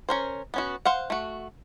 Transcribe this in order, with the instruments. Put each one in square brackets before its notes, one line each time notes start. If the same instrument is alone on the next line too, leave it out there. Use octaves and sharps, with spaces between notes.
[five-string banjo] C#4 A#4 C5
B3 C#4 F#4
C5 F5 F#5
A3 F#4